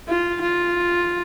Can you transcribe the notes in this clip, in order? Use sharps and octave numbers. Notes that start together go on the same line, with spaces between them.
F4
F4